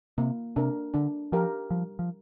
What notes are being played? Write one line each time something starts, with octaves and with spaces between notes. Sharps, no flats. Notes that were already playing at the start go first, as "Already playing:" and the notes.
C3 A#3
C3 D4 A#4
D3 D4
F3 G4 A#4 F5
F3 G3
F3